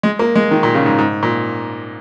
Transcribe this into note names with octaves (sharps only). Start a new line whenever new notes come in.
G#3
A#3
G#3
D#3
A#2
C#3
G#2
G#2
A#2